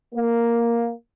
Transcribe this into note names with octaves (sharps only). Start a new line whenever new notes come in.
A#3